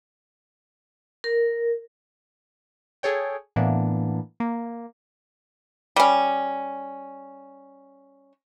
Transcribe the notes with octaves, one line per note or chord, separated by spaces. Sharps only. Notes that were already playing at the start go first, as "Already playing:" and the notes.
A#4
G#4 A4 C#5 G5
A2 E3 A#3 B3 D4
A#3
G3 C#4